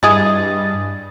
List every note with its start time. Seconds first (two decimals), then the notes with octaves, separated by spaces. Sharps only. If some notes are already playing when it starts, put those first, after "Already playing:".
0.03 G2 E4 G#4 D#5 D#6 A6